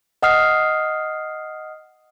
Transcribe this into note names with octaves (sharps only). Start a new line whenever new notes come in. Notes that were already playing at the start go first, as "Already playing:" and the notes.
D#5 F#5 D#6 F6 C7